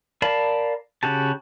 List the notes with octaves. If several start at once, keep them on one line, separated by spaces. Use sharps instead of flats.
A#4 D5 F5 A5 B5
C#3 F#4 G4 A5